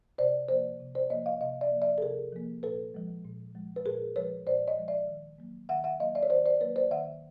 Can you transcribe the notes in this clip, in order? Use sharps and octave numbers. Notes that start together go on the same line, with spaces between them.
C3 C5 D5
F3 A#3 C5 D5
C3
C5 D5
F3 A#3 C#5 D#5
D#5 F5
C3 D#5 F5
D5 E5
F3 A#3
D5 E5
A4
C3 G#4 A#4
F3 A#3
A#2 A4 B4
F3 G#3
A#2
F3 G#3
B4
A#2 G#4 A#4
F3 G#3 B4 C#5
A#2 C5 D5
C#5 D#5
F3 G#3
D5 E5
D#3
F#3 A#3
D#3 E5 F#5
E5 F#5
F#3 A#3 D#5 F5
D5 E5
C#5
D#3 C5 D5
C5 D5
F#3 A#3 B4 C#5
C5 D5
D#3 E5 F#5